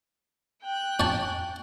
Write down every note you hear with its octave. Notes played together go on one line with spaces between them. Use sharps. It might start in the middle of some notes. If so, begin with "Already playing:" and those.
G5 F#6
C#4 A5